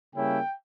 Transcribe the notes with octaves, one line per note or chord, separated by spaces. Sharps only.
C#3 G3 A#3 C#4 E4 G5